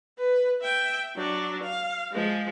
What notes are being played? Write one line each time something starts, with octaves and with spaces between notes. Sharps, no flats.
B4
E5 G5
F#3 D4
F5
F3 G#3